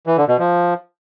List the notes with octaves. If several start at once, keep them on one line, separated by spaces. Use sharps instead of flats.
E3
D3
B2
F3